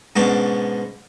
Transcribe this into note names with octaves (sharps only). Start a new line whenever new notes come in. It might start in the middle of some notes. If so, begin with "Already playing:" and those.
G#2 B2 C#4 D4